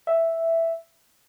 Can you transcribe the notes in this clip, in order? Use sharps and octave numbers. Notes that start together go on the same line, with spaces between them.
E5